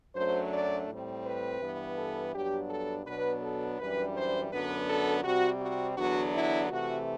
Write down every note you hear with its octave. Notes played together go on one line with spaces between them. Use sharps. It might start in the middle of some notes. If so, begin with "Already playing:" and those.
F#2 F#3 A3 D4 C5
D5
A2 G3 C4
B4
G2 E3 B3
A4
G2 F#3 B3 D4 G4
A4
B2 F#3 B3 D4 B4
A4
F#2 E3 G3 D4 B4
C5
F#2 D3 F#3 B3 D4 B4
A4
C3 G3 C4 F#4
F#4
E2 D3 F#3 B3 D4 F#4
E4
C3 E3 A3 F#4